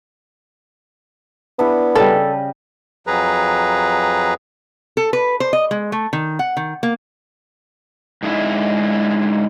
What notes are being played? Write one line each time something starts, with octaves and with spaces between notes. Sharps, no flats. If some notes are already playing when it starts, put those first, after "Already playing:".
B3 D4 E4 G#4
C#3 G3 A4 D5 D#5
F2 F#3 G#4 B4 A#5
A4
B4
C5
D#5
G#3
A3
D#3
F#5
D#3
A#3
G#2 D3 G#3 E4 E5